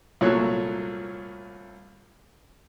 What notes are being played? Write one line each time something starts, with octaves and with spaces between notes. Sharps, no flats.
C2 A#2 F#3 A3 C#5 F#6